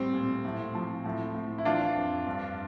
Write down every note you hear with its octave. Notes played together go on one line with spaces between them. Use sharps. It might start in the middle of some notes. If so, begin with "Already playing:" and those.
Already playing: A2 G3 C4
A#2
A2
F3
A2
A2
E4
E3 D4 F4
F2
G2